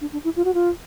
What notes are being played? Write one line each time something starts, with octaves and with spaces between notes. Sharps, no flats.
D4
D4
E4
F4
F#4
F4